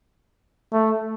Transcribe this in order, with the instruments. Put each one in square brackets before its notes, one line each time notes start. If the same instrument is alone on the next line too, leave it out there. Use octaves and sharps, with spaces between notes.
[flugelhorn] A3